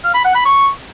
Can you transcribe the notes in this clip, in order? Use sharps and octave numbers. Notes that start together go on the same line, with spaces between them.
F5
B5
F#5
B5
C#6